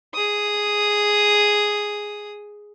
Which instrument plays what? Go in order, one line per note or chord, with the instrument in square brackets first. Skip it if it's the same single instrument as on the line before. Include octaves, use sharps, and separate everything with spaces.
[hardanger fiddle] G#4 D#6